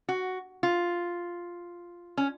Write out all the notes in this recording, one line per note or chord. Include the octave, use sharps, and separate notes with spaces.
F#4
F4
C#4